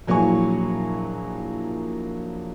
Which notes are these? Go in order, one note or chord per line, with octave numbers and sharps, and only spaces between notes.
A#1 F#3 A#3 E4 G#5 C#6